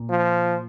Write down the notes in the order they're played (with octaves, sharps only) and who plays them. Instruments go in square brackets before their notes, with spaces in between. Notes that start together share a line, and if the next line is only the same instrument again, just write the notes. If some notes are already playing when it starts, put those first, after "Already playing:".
Already playing: [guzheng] A#2
[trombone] F3